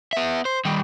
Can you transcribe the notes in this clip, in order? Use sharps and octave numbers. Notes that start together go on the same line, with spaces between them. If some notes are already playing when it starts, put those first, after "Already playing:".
B3 E5
C5
D#3 G3